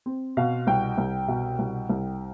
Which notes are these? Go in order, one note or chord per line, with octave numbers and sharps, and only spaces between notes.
C4
B2 F5
C2 G5
C2
B2
C2
C2